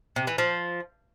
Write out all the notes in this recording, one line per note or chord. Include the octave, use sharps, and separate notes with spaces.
C3
E3
F3